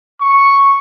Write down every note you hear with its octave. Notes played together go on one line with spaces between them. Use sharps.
C#6